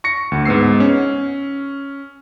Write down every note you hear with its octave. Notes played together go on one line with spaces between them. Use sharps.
C#6 A#6 C#7
D2
G#2 B3 E6 C7
C#4